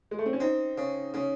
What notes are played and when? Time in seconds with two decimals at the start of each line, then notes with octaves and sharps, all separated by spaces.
0.11 G#3
0.18 A3
0.26 C4
0.33 C#4
0.40 C4 D#4
0.78 C#3
1.14 C#3 C#4